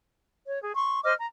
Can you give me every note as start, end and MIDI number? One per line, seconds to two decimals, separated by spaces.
0.46 0.60 73
0.63 0.72 68
0.75 1.00 84
0.75 1.00 85
1.04 1.13 72
1.04 1.13 75
1.04 1.13 86
1.04 1.13 89
1.19 1.26 82